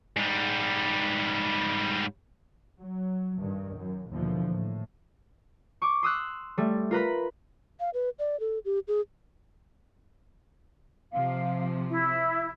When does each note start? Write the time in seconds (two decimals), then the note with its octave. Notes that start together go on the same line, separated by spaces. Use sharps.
0.17 G#2 G3
2.80 F#3
3.40 G2 D#3
3.78 F#2
4.12 D#2 B2 D3 E3 F3
4.51 A2
5.82 C#6 D6
6.03 C6 D#6 E6 F#6
6.58 G3 A3
6.91 F4 A#4 B4 B5
7.80 F5
7.94 B4
8.19 D5
8.40 A4
8.65 G4
8.88 G#4
11.12 C3 F3 F5
11.89 E4